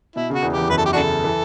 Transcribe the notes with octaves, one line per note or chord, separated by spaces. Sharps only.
B2 E4
C#3 F#4
E2 E3
E2 E3 G4
F#2 F#3 B4
A4
G4
C#3 D4 F#4 A4
E3